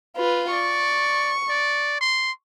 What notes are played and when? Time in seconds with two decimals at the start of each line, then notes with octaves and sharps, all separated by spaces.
0.17 F4 B4
0.51 D5 C#6
1.49 D5
2.01 C6